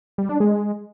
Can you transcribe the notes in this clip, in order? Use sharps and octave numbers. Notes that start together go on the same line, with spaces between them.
G3
D4
G#3